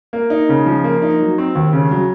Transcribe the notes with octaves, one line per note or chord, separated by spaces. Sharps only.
A#3
D#4
C#3
F3
A#3
D#4
F#3
C4
D#2
C#3
F#3